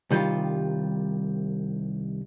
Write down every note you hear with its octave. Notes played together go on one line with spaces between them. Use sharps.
C2 D#3 G3 F4